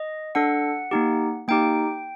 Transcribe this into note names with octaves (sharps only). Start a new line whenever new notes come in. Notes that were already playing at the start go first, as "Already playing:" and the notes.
Already playing: D#5
D4 A4 F#5
A#3 D#4 G4
A#3 D#4 G4 G5